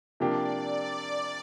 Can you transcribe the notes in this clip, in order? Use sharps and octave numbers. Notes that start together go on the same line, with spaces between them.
C3 F3 A#3 D4 G4 D5